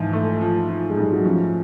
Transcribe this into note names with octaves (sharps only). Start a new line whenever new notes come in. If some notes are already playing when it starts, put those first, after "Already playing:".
Already playing: G#2 E3 F3
A3
F3
F3
G#3
G#2 G3
F#3
F3 C#4